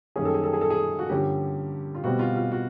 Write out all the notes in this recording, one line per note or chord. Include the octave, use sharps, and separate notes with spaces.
F#2 D#3 G3 A#3 C#4 G#4
A4
G#4
A4
G#4
A4
G#4
F#4
G2 D3 F3 A#3 C#4 G4
F4
B2 G3 C4 F#4
F4
F4
F#4